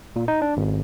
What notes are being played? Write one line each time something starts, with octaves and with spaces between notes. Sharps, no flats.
A#2
D#4
D4
G#1